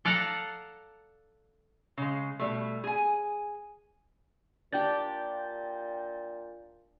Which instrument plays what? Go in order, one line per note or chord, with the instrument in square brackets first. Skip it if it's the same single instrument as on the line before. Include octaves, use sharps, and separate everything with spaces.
[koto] A4 D5 F5 F#5 A5 A#5
[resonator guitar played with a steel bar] C#3 G#3
B2 G3 A3
G#4 G#5
[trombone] A#2 [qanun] D4 G4 [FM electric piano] G5 G6 A6